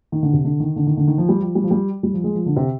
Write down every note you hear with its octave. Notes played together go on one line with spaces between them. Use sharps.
D#3
D3
C3
D3
D#3
D3
D#3
D3
D#3
F3
G3
F3
G3
F3
G3
G3
F3
G#3
F3
D3
C3